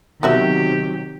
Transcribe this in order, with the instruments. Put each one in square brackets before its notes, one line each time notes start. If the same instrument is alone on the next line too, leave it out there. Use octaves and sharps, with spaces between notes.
[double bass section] C3 D#3 F#3 [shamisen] B3 F#4 E5 [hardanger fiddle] G4